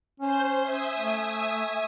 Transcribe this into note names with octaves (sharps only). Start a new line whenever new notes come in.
C#4 C5 G6
E5 G#5 D#6
A3